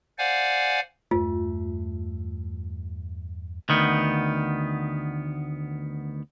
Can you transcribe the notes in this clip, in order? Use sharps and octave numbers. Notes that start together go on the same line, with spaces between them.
C5 D5 F5 F#5 G#5
E2 G2 A3 F4
D2 D#3 B3